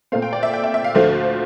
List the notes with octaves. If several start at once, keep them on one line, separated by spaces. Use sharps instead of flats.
A#2 A3 C4 F5
G5
D5
E5
G5
E5
E5
F5
D2 D3 F3 A3